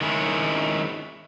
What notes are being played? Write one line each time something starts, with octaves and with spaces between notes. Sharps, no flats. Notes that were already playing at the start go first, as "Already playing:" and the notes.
D#3 G#3 C#4 E4